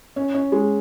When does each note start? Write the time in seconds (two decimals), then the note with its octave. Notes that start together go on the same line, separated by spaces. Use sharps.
0.16 C#4
0.34 C#4
0.52 G#3